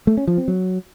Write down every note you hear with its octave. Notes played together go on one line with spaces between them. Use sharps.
A3
C#4
F3
C4
F#3